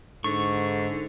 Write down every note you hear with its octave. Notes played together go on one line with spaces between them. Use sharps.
G#2 D3 C#6